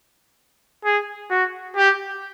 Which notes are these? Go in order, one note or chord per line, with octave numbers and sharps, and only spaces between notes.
G#4
F#4
G4